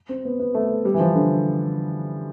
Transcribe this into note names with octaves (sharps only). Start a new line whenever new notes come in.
C4
B3
B3
A3
G3
E3
F3
D3